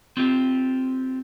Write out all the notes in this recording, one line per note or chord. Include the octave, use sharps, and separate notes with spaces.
C4 F4 G4